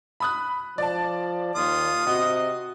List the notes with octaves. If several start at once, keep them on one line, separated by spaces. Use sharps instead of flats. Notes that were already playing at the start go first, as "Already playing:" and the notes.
B5 D#6 F#6
F3 D5 A5
D#2 F4 D#6
C3 F#4 D#5